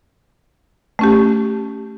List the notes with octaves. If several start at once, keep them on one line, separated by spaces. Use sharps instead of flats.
A3 C#4 G4